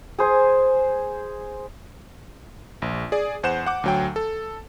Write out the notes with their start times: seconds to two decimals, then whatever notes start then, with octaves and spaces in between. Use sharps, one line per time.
0.18 G#4 C5 G#5
2.82 A#1
3.12 G#4 D5
3.43 E2 C5 F#5 G6 E7
3.66 F#5 D6
3.84 D2 F#3 G5
4.16 A4